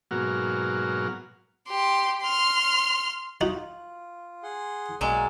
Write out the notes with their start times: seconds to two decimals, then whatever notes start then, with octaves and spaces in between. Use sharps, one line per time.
0.11 G#2 B2 F#3 A#3 F#4 F6
1.68 G4 C6
2.22 C6 F6
3.41 D#4 F4 F#4
4.43 G#4 F#5 C6
5.01 B1 F#3 G#3 A#3 G#4 D5